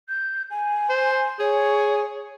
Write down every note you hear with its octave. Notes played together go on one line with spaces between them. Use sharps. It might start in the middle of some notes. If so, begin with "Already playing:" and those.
G6
G#5
C5
G#4 C#5